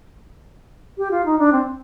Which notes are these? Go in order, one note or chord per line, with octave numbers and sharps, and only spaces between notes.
G4
F4
D#4
D4
C4